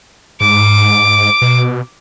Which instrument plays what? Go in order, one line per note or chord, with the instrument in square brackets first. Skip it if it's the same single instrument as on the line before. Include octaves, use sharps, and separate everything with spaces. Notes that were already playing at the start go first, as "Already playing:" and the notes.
[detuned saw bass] G#2 [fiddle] D6
[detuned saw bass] B2